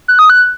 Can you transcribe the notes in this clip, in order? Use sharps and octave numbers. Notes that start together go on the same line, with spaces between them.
F#6
D#6
F#6